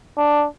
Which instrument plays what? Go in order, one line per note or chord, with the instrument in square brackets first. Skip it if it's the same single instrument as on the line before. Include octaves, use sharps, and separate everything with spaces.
[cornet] D4